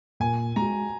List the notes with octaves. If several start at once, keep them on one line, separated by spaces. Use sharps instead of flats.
A#2 G#5
G#3 A#5
F#4